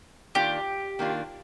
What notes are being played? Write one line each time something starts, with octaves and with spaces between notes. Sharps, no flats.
D#3 A#3 D4 F4 G4
D#3 A#3 D4 F4